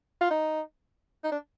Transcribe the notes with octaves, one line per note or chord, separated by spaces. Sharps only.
F4
D#4
D#4
D4